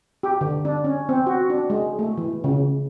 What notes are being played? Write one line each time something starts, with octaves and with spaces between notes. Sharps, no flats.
G4
D3
D4
C#4
C4
F#4
D4
G#3
A3
E3
C#3